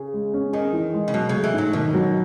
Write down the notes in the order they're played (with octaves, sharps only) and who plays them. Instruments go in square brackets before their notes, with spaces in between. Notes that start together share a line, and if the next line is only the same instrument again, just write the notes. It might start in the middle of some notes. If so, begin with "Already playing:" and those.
Already playing: [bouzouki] C#3
[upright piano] G#3
C#4
[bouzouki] D#3 [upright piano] G#4
[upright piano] E3
G#3
[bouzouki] C#3
[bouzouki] B2 [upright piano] F#3
[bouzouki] C#3 [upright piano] A3
[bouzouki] E3
[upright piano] G#2 [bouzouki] F#3
[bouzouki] B2 [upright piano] D#3
[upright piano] F#3